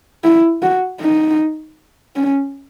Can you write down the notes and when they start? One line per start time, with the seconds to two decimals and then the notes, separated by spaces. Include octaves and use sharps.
0.24 E4
0.63 F#4
1.01 D#4
2.16 C#4